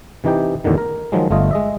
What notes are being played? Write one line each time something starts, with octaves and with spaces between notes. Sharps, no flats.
C3 E3 D#4 G4 G5
E2 A2 D3 D#3
A#4
D#3 F3 F#3 G#3
G1 A3 F4 D#5
G#3 D#5 E5